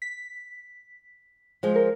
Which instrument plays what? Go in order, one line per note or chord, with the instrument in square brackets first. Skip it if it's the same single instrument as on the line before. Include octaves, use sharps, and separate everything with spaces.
[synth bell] B6
[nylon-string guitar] F3 G#3
[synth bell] A#4